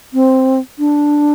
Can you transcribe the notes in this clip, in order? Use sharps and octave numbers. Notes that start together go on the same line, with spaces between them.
C4
D4